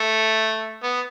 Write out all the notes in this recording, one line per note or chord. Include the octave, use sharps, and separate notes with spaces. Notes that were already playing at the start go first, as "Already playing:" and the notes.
Already playing: A3
B3